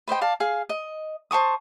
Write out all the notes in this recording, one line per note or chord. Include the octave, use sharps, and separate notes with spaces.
B4 C5 D#5 G5
D5 F5 A5
G#4 F5
D#5
C5 A5 C#6 D#6